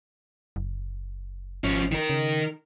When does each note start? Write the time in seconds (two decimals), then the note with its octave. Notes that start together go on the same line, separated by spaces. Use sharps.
0.56 F#1
1.64 G#1 F3 C#4
1.92 D#3 A#4
2.10 C#3